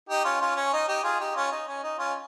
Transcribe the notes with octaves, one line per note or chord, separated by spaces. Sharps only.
D#4 G4
C#4 F4
C#4 F4
C#4
D#4
D#4 G4
F4 G#4
D#4 G4
C#4 F4
D#4
C#4
D#4
C#4 F4